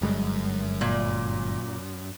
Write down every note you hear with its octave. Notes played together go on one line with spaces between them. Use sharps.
G1 F#2 G3 G#3
A#2